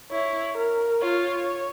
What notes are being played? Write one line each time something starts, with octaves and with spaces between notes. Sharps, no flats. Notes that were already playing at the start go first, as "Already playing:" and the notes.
E4 C#5
A#4
F4 C#5